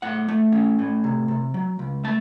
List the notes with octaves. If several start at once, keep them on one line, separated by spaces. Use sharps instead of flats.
A2 F#5
A3
C#4
A2
C3
C3
F#3
C#2
A3 A5